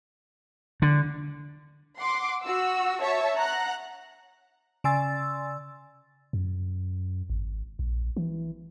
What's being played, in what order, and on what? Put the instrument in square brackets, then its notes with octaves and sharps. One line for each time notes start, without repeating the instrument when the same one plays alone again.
[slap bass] D3
[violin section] F#5 C6 D6
F#4 E6
C#5 E5 A5 C#6
F#5 A#5 F#6
[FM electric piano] C#3 D5 G#5 C6 E6 A6
[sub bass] F#2
G#1
A#1
E3